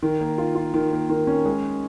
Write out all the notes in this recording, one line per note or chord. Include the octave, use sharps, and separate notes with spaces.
D#3
A#3
F4
F4
D#3
A#3
D#3
C#4
G#3